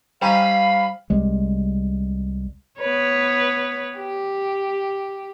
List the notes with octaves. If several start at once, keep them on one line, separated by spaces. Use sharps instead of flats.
G3 C#4 D#4 C5 F5 G5 A#5 B5
C2 G3 G#3
B3 B4 C#5
G4